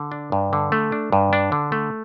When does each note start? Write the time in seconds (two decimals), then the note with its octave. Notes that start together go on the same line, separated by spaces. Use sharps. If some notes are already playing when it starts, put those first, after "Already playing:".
Already playing: D3
0.12 D4
0.32 G2
0.53 D3
0.72 A3
0.92 D4
1.12 G2
1.33 D4
1.52 D3
1.72 A3